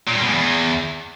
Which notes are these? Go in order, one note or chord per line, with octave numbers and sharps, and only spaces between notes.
A#2
G2
B2
G#2
E2